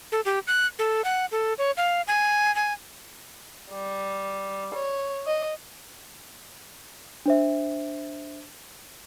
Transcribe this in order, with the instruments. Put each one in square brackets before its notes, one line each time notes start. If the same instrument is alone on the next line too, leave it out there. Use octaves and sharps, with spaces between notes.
[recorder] A4
G4
F#6
A4
F#5
A4
C#5
F5
G#5
G#5
[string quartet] G3
C#5
D#5
[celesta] D4 C5 E5